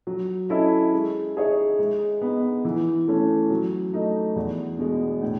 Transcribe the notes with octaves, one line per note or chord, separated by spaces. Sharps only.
F#3
C#4 E4 A4 D#5
G#3
D#4 G#4 C#5 E5
G#3
B3 D#4
E3
A3 C#4
F#3
A3 D#4
E2
B2 G#3
A2